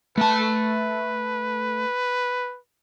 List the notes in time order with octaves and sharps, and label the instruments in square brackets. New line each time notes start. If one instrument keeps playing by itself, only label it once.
[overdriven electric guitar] A3 A5 [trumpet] B4